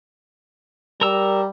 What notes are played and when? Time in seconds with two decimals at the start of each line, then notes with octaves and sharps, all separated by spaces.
1.01 G3 A#4 A#5 E6